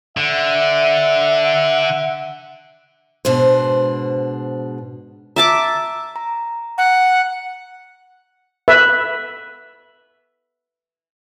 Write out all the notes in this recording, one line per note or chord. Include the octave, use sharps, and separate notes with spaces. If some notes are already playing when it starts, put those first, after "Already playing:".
D3 E5 F#5
G#2 B2 D4 C5
E5 A5 A#5 D6 E6 A6
A#5
F#5
B4 E5